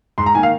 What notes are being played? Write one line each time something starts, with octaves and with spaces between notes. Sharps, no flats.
G#2 C6
A#5
D#3 A#3 G#5
F5